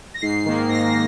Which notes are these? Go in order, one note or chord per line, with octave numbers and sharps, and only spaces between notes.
A#6
G#2 C7
D#3 A#3
G#2 A#6